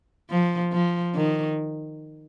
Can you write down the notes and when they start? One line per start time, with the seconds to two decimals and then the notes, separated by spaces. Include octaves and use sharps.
0.30 F3
0.73 F3
1.15 D#3